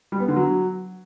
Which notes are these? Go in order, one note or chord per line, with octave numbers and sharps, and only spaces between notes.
G3
B3
D3
F#3